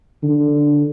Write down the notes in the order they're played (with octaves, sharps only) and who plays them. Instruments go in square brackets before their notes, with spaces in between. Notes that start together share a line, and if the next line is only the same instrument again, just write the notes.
[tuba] D3